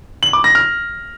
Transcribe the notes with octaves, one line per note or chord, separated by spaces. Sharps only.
F#7
D6
A#6
F6